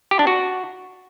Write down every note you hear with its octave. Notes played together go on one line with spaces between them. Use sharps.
G4
D4
F#4